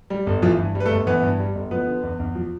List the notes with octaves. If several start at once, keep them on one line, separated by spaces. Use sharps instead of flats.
G3
G1
E3 F3 F4
G2
G3
B4
A3 A4
G1
E3 B3 B4
G2
G3
G1
F3 B3 B4
D3
E2
E2
F3